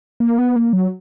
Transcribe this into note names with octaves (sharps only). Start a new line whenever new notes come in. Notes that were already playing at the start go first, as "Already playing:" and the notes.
A#3
B3
A#3
F#3